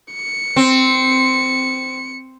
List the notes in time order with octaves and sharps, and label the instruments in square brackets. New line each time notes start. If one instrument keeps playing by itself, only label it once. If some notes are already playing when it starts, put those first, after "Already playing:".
[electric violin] C#7
[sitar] C4